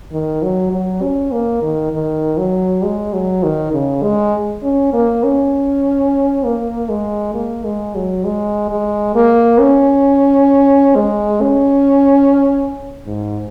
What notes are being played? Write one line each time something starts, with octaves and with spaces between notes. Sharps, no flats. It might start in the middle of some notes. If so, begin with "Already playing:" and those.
D#3
F#3
F#3
C#4
A#3
D#3
D#3
F#3
G#3
F#3
D#3
C#3
G#3
C#4
A#3
C#4
A#3
G#3
A#3
G#3
F#3
G#3
G#3
A#3
C#4
G#3
C#4
G#2